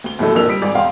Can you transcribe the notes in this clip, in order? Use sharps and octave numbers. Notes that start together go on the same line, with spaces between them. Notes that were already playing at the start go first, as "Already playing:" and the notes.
D2 G7
D#2 A2 F#3 A3
A#1 F2 D4 A#4 E6 F7
G3 D#6 B6 D7
G#1 G#4 D5
E1 F5 G5 C6